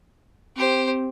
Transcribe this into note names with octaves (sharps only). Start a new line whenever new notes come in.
C4 G4 C5